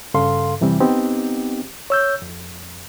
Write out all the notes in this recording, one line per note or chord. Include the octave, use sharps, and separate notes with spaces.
G2 C#3 A4 F5 C6
F2 C3 E3 G3 C4
B3 C4 D#4 G4
C#5 E6 G6
F2